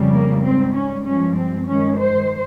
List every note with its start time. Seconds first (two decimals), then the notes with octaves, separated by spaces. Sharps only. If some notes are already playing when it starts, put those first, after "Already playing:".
Already playing: F2 C#3 G3
0.13 A#3
0.44 G#2 G3 C4
0.75 C#4
1.05 G2 F3 G#3 C#4
1.36 C4
1.67 G2 D#3 G#3 C#4
1.98 C5